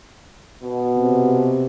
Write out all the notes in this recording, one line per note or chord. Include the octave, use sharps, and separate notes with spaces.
B2
C3